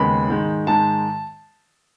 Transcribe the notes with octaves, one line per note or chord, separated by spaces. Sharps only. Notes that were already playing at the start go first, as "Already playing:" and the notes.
Already playing: D#2 C#3 G#3 B3 B5
G#2 D#3 G#3
G#2 D#3 G#3 A5